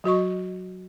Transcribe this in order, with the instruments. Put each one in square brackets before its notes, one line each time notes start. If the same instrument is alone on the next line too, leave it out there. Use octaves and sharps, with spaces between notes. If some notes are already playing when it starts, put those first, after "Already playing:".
[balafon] F#3 F#4 D#5 C#6